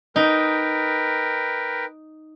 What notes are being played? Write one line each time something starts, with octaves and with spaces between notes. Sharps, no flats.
D#4 A#4 B4 G5